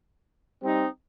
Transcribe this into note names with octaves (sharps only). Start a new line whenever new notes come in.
G3 C4 D#4